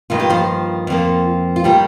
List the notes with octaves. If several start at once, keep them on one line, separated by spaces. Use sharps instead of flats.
G2 D#3 A#3 F4
G4
F3 F4
F2 F3 A#3
F4
D#3 G3 A#3 G4